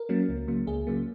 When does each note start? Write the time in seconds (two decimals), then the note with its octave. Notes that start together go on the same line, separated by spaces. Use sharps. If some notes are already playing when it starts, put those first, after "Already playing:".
Already playing: A#4
0.09 F#3 A#3 C#4
0.29 C#2
0.48 C#3 F#3 A#3
0.67 C#2 G#4
0.87 C#3 F#3 A#3